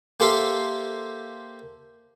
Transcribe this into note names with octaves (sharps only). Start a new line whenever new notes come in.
A#3 G4 A4 C5 E5 F5